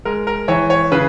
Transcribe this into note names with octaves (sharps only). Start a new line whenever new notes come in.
G#3 A#4
A#4
E3 C#5
C#5
C#3 B4